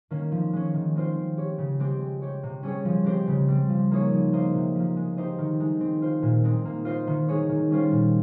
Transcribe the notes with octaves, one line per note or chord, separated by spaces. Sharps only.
D#3 A#3 C#4
F3
G#3 C#4
D#3
G#3 C4 F4 C5
C4
G4 C#5
C#3
G#3 C4 G4
C4
G4 C#5
C3
G3 C#4 G#4 C#5
F3
G#3 C4 G4 C5
C#3
G3 C4
F3
A#3 D#4 G#4 C#5
F3
A#3 F4 C5 D#5
C3
F3 A#3
G#3
D#4 G4 C5 D#5
D#3
G#3 D#4
C4
F4 C5
A#2
G#3 C4 D#4
A#3
F4 C5 D#5
D#3
G#3 D#4 G#4 C#5
D#3
G3 C#4 F4 C5
A#2